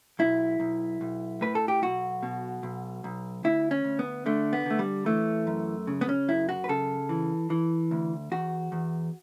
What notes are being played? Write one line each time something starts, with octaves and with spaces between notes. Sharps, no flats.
B1 E4
B1
B1
A2 B4
A4
G4
B1 F#4
B2
B1
B1
D2 E4
C#4
D2
B3
D3 A3
B3
D3 A3
G3
E3 A3
F#2
C#3
B3
C#4
F#2 E4
F#4
B4
C#3 A4
E3
E3
D2
E2 F#4
E2